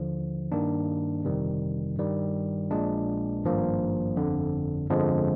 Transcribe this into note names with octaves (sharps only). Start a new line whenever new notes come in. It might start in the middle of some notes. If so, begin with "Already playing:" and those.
Already playing: D#2 D3 F3
G2 D#3 A#3 D4
G1 F2 C3 D#3 G3
G2 D#3 G3
A#1 A#2 G#3 D4
G#1 G2 F3 A#3
G1 F2 D3
G1 F2 D3 F3 G#3